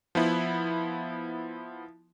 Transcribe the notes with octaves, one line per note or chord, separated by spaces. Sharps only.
F3 B3 E4